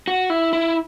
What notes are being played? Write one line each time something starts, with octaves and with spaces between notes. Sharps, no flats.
F#4
E4
E4